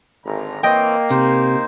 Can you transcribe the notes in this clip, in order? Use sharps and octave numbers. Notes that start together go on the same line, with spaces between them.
G#1 D3 A#5
E3 A#3 C4 C#5 D#5 G5
C3 D#4 C5